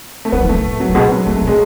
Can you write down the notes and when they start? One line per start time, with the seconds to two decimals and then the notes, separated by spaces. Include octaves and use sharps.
0.25 A3
0.32 F#3 B3
0.43 E3
0.49 A3
0.54 C#3
0.64 A2
0.80 F#3
0.89 A2
0.95 B2 G#3
1.11 F#3
1.26 A2 A3
1.36 A3
1.41 B2
1.47 G#3